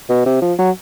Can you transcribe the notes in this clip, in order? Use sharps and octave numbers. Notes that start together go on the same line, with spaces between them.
B2
C3
F3
F#3